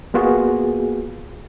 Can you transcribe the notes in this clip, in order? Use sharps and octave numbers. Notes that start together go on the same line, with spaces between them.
A#3 B3 F4 F#4 G#4